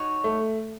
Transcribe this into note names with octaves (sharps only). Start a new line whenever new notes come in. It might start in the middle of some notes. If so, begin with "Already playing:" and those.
Already playing: D#4 F#4 C#5
A3